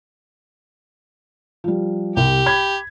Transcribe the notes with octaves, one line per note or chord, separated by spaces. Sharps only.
F3 G3
C2 G4
B5 G#6